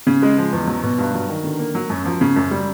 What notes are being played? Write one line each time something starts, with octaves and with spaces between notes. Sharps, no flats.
C#3
G#3
F3
E2
F#3
B2
G2
F#3
D#3
D3
A#3
F#3
F#2
F3
C#3
F#2
G3